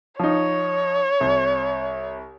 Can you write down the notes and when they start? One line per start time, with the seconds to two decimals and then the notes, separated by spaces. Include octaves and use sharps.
0.19 F3 D#4 C#5
1.21 C2